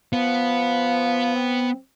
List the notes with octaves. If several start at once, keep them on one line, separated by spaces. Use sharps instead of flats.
F3 B3
C4